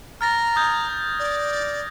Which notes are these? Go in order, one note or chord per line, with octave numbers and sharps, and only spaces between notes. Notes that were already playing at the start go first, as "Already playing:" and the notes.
A#5 F6 A6 A#6
D#6 G6 G#6
D5